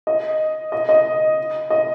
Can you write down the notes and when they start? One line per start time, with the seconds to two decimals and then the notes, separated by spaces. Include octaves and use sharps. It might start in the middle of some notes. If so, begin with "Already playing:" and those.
0.07 D#5
0.72 D#5
0.89 D#5
1.70 D#5